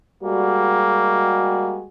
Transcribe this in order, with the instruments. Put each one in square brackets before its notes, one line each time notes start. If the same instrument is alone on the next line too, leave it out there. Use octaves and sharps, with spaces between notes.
[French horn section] G3 G#3 F#4 [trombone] A#3